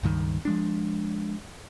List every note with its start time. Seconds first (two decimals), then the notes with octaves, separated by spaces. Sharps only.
0.03 C#2 G2 D#3
0.45 F3 G#3 D4